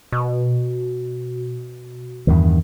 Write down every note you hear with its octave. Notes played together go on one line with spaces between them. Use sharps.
B2
E2 G2 D#3